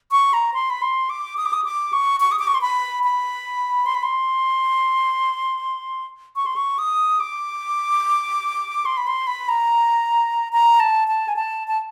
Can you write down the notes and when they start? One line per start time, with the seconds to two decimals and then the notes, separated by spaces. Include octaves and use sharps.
0.11 C#6
0.33 A#5
0.54 C6
0.70 B5
0.82 C6
1.10 D6
1.37 D#6
1.45 D6
1.53 D#6
1.64 D6
1.93 C#6
2.20 C#6
2.32 D#6
2.39 D6
2.47 C#6
2.54 C6
2.61 B5
3.04 B5
3.86 C6
3.95 B5
4.03 C6
6.36 C#6
6.46 C6
6.56 C#6
6.79 D#6
7.20 D6
8.86 C6
8.97 B5
9.07 C6
9.27 B5
9.48 A#5
10.53 A#5
10.80 A5
11.08 A5
11.28 G#5
11.36 A5
11.68 A5